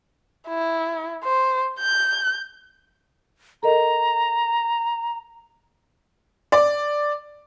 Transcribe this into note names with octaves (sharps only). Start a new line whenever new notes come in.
E4
C5
G6
A4 A#4 D#5 A#5
D5